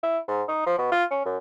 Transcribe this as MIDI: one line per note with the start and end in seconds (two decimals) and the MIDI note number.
0.03 0.18 64
0.28 0.43 44
0.48 0.65 63
0.66 0.74 53
0.78 0.91 47
0.92 1.04 65
1.11 1.23 61
1.25 1.37 42